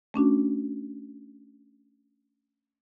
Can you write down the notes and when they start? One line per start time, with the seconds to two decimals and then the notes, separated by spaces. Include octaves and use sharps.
0.14 A3 C#4 D4 F#4